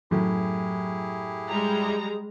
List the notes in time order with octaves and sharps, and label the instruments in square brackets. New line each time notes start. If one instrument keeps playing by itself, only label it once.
[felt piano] F#2 A2 [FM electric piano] F#3 [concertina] E4 G4 G#4
[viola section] G3 G#3 A#5